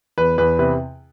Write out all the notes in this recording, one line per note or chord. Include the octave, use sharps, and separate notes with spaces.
E2 B4
E2 B4
C3 B4